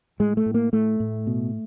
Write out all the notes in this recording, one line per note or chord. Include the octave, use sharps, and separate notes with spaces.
A2 G#3
A3
A2
A#3
A2 A3
A2
B2